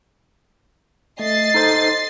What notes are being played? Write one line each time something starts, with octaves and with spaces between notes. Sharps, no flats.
A3 D#5 A6 C7
D#4 A4 C5